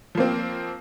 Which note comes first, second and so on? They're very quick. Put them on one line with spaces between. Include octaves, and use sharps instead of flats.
F3 A#3 C4